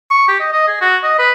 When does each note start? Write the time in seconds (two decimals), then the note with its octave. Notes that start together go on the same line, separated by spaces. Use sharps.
0.11 C#6
0.28 G4
0.40 D#5
0.53 D#5
0.68 G#4
0.81 F#4
1.03 D#5
1.19 B4